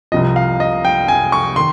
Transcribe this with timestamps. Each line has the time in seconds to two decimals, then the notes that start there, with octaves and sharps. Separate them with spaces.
0.12 C2 C3 F3 D#5
0.36 F5
0.60 D#5
0.85 G5
1.08 G#5
1.32 C#6
1.56 D#3 C6